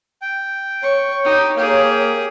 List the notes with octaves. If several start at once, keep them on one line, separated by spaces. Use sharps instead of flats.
G5
C#5 C#6
D#4 G4 C#5
A#3 G4 G#4